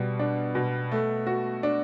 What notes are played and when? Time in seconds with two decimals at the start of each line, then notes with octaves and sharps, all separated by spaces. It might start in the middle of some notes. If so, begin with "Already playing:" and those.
Already playing: B2 G3
0.19 D4
0.55 B2
0.91 A3
1.27 F#4
1.63 D4